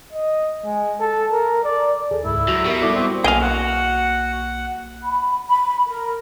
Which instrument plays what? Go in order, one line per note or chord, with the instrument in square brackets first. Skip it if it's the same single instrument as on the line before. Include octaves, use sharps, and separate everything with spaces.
[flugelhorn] D#5
G#3
A4
A#4
D5
[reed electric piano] D#2 [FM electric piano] G#4 A4
[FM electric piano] C#2 G#2 [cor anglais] E4
[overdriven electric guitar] F#2 [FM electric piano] F#4
[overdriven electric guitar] B2 [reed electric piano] G4 A#4 E5
[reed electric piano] G3 E4 A4 [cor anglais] D5
[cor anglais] C4
[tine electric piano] B1 A#3 [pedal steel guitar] G#4 D#5 F5 [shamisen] G5 G#5
[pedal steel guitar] F#4 [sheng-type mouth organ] F#5
[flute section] B5
B5
A#4